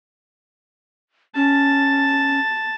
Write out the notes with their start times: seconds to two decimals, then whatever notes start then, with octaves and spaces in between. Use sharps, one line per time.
1.36 C#4 A5